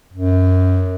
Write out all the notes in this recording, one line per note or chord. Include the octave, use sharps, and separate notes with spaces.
F#2